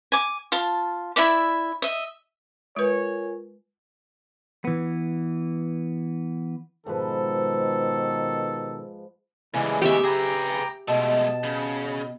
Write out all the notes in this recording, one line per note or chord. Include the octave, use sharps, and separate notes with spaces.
G#5 D6
F4 A5
E4 D5 E5 D6
D#5 E5
G#3 F4 A#4 B4 C#5 G#5
E3 B3
G#2 B2 D#3 F3 A4 B4
A2 C#3 E3 G3 G#3
B2 A3 G4 E5
G#4 B4 G5 A#5 D6
B2 G#3 A3 A5
C#3